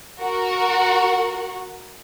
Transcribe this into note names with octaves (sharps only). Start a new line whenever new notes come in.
F#4 A#4 F#5